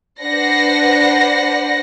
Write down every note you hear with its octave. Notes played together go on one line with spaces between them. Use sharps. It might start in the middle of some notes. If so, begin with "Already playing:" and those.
D4 B4 C5 F#5 A#6 C7